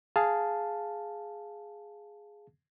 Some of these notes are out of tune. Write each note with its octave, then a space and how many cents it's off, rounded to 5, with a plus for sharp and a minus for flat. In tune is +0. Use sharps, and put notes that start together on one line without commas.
G#4 +0 F5 +0 A5 +0